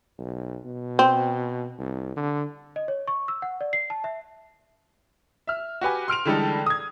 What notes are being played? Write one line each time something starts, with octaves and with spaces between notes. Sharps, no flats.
B1
B2
C4
C2
D3
D#5
C#5
C#6
E6
F#5
D5
C7
A5
E5
E5 F6
F#4 G4 B4 G#5
C6 F6 D7 F7
D3 E3 G3 G#3 D#4 A4
D#6 G#6